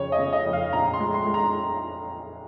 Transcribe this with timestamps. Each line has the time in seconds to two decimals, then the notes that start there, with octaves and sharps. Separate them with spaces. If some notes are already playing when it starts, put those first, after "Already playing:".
Already playing: F2 C#3 C#5
0.12 D#5
0.18 C#3
0.33 D#5
0.46 F2
0.53 F5
0.73 A#1 A#5
0.93 C6
1.00 G#3
1.14 C6
1.27 G#3
1.34 A#5